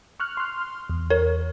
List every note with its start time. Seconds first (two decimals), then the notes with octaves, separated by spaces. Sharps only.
0.20 C#6 F6 F#6
0.37 C6 F6
0.90 E2
1.10 A#4 C#5